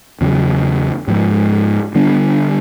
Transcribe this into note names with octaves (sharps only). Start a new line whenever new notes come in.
E2 C#3 F#3
G#2 F3 G#3
D3 G3 B3 D4